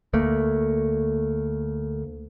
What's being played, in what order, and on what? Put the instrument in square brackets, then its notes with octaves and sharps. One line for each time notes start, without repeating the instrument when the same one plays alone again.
[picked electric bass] D2 A3 A#3